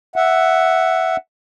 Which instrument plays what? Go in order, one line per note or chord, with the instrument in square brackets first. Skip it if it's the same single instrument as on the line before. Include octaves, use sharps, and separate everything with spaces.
[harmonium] E5 F#5